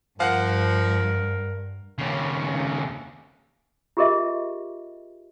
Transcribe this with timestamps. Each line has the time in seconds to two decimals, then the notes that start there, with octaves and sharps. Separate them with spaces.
0.20 G2 F3 A#4 F5 F#5 F#6
1.98 D#2 C#3
3.97 F4 G4 G#4 A#4 D#5 E5